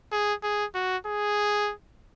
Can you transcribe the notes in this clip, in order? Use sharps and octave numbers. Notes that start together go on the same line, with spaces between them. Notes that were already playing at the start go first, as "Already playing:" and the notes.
G#4
G#4
F#4
G#4